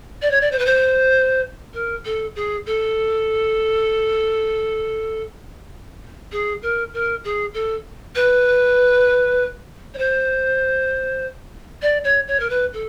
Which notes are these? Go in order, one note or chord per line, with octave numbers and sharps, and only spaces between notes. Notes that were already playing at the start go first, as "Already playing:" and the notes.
D5
C#5
D5
C5
B4
C5
A#4
A4
G#4
A4
G#4
A#4
A#4
G#4
A4
B4
C#5
C5
D5
C#5
C#5
A#4
B4
A4